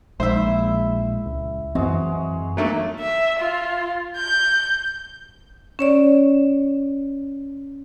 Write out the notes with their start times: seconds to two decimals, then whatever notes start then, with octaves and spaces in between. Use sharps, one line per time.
0.20 A#1 G#3 E4 C5 E5
1.25 C#2
1.75 F#2 E3 G#3 C4 F#4
2.57 E2 F#3 A3 A#3
3.00 E5
3.40 F4
4.17 G6
5.79 C#4 C#5 D5